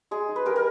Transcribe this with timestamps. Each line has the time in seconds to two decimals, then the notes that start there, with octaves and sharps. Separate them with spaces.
0.11 G#3 G#4
0.28 D#4
0.36 B4
0.46 D#4 G4 A#4
0.56 A#4